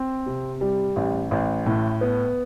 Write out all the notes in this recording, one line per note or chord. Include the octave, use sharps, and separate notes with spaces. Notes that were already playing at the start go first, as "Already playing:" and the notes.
Already playing: C4
C3
G3
A1
A1
A2
B3